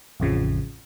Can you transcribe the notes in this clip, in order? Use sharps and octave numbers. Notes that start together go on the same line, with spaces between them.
A1 F2 C#3 F3